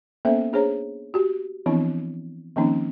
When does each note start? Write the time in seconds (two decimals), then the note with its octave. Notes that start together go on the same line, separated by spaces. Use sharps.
0.25 A#3 B3 C#4 A4 C5 E5
0.53 D4 G#4 C5 C#5 A#5
1.14 F#4 G4
1.66 E3 F3 B3 C4 D4 E4
2.56 D#3 F3 A#3 C4 C#4 D#4